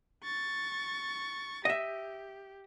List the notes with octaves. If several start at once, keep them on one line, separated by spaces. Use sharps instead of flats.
C#6 A6
G4 D#5 E5